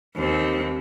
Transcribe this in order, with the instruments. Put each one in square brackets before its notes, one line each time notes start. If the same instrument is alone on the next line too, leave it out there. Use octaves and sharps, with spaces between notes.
[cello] D#2 C4